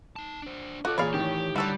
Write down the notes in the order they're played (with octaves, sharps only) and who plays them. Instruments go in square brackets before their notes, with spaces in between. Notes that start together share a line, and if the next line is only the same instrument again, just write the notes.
[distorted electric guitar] D#4 A5
D4 C5
[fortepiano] F4 A4 D6 [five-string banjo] F#4 [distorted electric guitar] C#5 D#5
[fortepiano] A#2 G#4 B5 [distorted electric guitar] E3 [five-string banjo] C#5 D5 F5
[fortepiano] A2 D#3 [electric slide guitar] G4
[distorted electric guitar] D3 [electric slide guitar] G3 [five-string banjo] F#4 A4 C#5